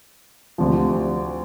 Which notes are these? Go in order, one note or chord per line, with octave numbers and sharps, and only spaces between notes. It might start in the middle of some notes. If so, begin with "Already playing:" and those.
D2 C3 F3